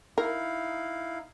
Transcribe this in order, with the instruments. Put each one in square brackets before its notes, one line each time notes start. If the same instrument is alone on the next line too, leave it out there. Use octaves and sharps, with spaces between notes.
[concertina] D#4 E4 F5 [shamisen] A#4